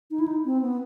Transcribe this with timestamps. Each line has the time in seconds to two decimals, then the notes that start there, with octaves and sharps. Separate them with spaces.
0.11 D#4
0.20 E4
0.28 D#4
0.45 C4
0.62 B3